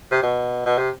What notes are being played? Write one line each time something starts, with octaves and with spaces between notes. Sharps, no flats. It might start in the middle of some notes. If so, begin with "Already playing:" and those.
C3
B2
B2
C3